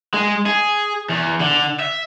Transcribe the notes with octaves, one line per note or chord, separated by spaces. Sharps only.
G#3
G#4
E2
D3
E5